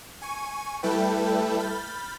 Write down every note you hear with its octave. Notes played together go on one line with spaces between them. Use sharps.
G#5 C#6 D#7
G3 A3 E4 A4 B4 G5
B5 F6 G6 A6